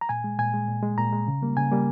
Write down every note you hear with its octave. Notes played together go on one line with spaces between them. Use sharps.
A#5
A#2 G#5
G#3
A#2 G#5
G#3
A#2
G#3
A#2 A#5
G#3
C#3
G3 A#3
C#3 G#5
G3 A#3